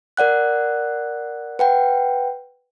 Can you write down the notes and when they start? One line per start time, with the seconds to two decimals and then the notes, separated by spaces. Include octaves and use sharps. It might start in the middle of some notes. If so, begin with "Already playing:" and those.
0.17 A#4 D5 F#5 F#6
1.59 B4 F#5 G5